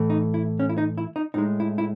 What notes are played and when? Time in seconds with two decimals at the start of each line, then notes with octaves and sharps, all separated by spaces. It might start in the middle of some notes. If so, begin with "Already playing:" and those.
Already playing: A2 E3 A3
0.10 D#4
0.34 E4
0.60 C#4
0.69 E4
0.78 D#4
0.98 E4
1.16 D#4
1.34 A2 G#3 D#4
1.60 E4
1.78 E4